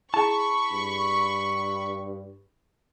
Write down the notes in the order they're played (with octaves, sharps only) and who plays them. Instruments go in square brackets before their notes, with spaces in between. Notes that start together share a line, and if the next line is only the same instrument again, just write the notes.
[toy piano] E4 G#4 [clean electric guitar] A5 [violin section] B5 C#6
[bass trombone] G2